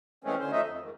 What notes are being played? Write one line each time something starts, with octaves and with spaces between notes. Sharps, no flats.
C#3 E3 G#3 A3 C4 C#4
D2 D3 C#4 C5
F3 A3 D#4 D#5 E5
F2
G#2 D#3